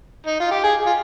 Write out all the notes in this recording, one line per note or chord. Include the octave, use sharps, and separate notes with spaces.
D#4
F4
G4
G#4
F4